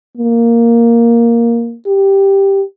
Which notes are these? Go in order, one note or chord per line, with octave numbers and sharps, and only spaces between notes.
A#3
G4